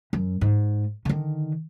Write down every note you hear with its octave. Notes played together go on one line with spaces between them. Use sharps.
F#2
G#2
D3 D#3